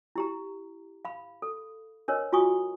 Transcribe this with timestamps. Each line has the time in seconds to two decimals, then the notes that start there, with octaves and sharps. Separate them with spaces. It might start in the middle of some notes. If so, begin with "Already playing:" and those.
0.16 E4 G4 A#5
1.05 F5 B5
1.42 A4
2.08 D4 A#4 B4 C#5 D#5
2.33 F4 F#4 G#5 C#6 D#6